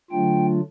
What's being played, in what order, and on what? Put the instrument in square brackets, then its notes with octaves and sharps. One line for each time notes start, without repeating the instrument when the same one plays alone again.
[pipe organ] D3 F#3 A3 D4 F4 G5